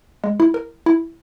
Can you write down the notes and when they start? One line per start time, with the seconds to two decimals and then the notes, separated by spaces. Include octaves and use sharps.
0.24 G#3
0.40 E4
0.54 A#4
0.86 E4